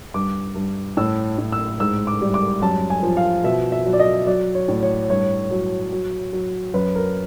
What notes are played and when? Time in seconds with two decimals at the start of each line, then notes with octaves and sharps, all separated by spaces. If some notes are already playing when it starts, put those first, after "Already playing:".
0.14 G2 D6
0.55 G2
0.97 A2 E6
1.38 A2
1.52 E6
1.80 G#2 E6
2.07 D6
2.21 G3
2.34 D6
2.62 F#2 A5
2.90 G#5
3.03 F3
3.17 F5
3.44 B2 E5
3.72 E5
3.86 F#3
3.93 D5
3.99 D#5
4.27 F#3 D5
4.55 C#5
4.68 A2
4.83 C#5
5.10 G2 C#5
5.51 F#3
5.92 F#3
6.33 F#3
6.74 F#2 B4
6.95 A#4